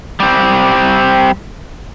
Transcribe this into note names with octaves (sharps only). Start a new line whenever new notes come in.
G3 C4